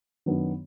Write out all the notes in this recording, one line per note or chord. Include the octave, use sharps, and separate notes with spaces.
F#2 D#3 F#3 B3 D4